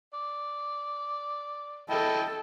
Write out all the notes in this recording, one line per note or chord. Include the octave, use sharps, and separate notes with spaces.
D5
E4 A4 D#5 G5